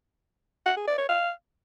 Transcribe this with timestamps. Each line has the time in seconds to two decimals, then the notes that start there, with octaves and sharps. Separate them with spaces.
0.66 F#5
0.77 G#4
0.87 D5
0.98 C#5
1.09 F5